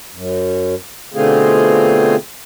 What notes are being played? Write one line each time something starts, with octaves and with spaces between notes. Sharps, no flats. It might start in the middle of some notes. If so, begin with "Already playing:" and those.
F#2
B2 D3 A3 C4 F4 G#4